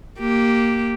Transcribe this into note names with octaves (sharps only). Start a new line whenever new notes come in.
A#3 G4